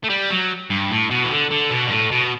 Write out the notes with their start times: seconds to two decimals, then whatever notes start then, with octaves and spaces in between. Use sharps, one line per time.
0.04 A3
0.10 G3
0.30 F#3
0.70 G2
0.91 A2
1.11 B2
1.25 E3
1.31 D3
1.51 D3
1.71 B2
1.87 G2
1.91 A2
2.12 B2